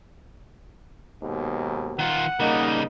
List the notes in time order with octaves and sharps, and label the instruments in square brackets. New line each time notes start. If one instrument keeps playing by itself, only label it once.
[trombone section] D#2 G#2 B2
[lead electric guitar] D#3 F4 [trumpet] F#5
[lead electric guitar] C#3 G3 [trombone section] A#3 D#4